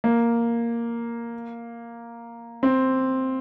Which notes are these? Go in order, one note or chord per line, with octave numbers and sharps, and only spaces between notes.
A#3
C4